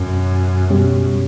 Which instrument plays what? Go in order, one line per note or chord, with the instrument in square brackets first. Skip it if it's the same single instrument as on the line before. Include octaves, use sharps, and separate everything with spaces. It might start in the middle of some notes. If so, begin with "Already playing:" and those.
Already playing: [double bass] F#2 [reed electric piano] B2 C#4
[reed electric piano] C#2 B2 G3 C#4 G4